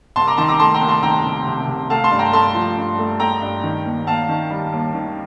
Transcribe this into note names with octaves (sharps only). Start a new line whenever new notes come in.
C2 A5 C6
A#5 D6
D#3 A5 C6
A#5 D6
A3 A5 C6
G5 A#5
C2
A5 C6
D#3 G5 A#5
C3
C3
C3
A3 F5 A5
A5 C6
G2
G5 A#5
A3 A5 C6
F3
G2
A3
A3 G5 A#5
G2
D#3
D#2
D#2 F5 A5
D#3
G3
D#2
D#3